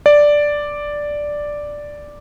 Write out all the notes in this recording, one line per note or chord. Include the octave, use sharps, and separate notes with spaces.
D5